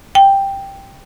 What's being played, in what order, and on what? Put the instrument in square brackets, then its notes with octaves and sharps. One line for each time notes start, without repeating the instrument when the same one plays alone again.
[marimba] G5